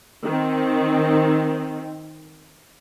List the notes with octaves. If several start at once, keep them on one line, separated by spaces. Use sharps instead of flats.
D#3 C4